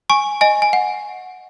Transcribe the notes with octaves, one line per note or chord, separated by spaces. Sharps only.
G#5 C#6
D#5 G#5
G#5
F#5